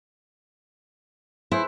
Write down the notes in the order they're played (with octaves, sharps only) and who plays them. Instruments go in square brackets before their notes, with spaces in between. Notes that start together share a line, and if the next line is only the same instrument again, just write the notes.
[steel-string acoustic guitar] E4 [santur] G#4 B4 C5